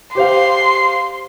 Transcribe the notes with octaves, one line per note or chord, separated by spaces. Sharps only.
G4 C5 F5 C6